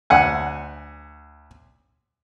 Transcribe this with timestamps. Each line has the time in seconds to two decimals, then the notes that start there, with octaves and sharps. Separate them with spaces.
0.10 D2 F#5 G#5